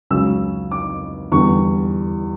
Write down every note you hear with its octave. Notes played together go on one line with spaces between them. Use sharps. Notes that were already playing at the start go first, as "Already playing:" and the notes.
C#2 C#3 F#3 C#4 E6
D6
E2 D3 G3 B3 C#6